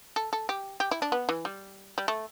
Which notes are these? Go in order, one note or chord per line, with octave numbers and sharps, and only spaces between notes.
A4
A4
G4
G4
E4
D4
B3
E3
G3
G3
A3